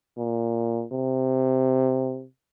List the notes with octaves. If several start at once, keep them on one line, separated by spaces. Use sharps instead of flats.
A#2
C3